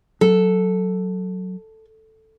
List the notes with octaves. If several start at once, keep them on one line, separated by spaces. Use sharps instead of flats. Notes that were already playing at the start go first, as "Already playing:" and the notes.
F#3 A4